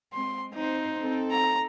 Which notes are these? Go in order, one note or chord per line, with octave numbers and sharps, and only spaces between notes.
G#3 C4 C6
C4 D#4 C5
C4 A4
A#5